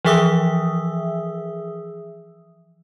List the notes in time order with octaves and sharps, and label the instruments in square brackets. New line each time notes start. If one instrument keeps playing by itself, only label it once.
[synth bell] E3 F3 G#4 E5 D#6 E6